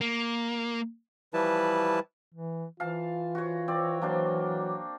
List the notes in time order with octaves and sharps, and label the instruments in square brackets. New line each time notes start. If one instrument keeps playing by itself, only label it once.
[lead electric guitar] A#3
[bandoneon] E3 F3 G3 E4 B4 A5
[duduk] E3
[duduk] E3 [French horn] F4 [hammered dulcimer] F5 A5
[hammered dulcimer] F#4 C#5
C4 C#5 D5
[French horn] F#3 [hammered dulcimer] A#3 D4 C5